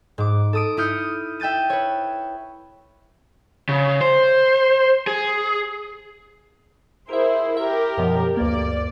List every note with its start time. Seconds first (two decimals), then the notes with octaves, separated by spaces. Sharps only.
0.18 G#2 D6
0.53 A4 D#6 D7
0.77 E4 D#6 F6 G6 C#7
1.40 E5 G5 G6 A6 D#7
1.70 B4 C#5
3.69 C#3
4.01 C5
5.07 G#4
7.09 E4 G#4 A#4 C5 E5
7.57 G4 A#4 E5
7.97 F#2 B2 F3
8.37 D2 G2 A#3 D5